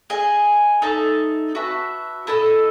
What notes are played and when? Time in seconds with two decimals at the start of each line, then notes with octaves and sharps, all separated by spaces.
0.10 G#4 D#5 G#5
0.82 D#4 A4 E5 A5
1.55 F#4 B4 E5 A5
2.27 E4 A4 D#5